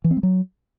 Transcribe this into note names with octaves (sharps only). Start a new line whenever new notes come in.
E3
C4
G#3
F#3